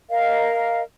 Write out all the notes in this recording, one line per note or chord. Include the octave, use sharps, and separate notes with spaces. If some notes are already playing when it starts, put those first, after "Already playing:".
A#4 D#5 F5